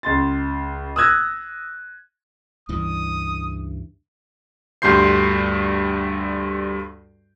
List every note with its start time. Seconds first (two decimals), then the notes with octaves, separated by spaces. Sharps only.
0.03 C#2 C6 A6
0.96 D#6 E6 F#6 G#6 A#6
2.69 C#2 G2 E3 D#6
4.82 D2 G2 G3 C6 G6 C7